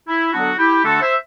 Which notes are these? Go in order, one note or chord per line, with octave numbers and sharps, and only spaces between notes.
E4
D3 F#3 B3 D4 F#4
E4 G4
D3 A3 D4 F#4 A4
C5 E5